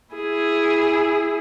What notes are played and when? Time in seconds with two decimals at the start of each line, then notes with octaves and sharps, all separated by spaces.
0.14 E4 G#4